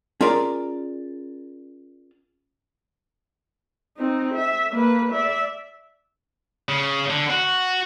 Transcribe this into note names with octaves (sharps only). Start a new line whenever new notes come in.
C#4 F4 G#4 A#4 D5
C4 D#4
E5
A#3 B4
D5 E5
C#3
D3
F#4